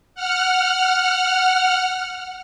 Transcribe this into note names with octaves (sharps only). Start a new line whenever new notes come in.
F#5 F6